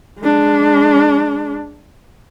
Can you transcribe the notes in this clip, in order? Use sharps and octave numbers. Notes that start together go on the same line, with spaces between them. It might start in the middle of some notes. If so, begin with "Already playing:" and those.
G#3 D4